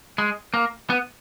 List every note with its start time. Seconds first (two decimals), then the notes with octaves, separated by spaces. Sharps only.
0.18 G#3
0.54 A#3
0.90 B3